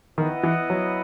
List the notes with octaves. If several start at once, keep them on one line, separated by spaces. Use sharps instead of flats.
D#3 B3 E4 B4 D#5 F#5
E3
F#3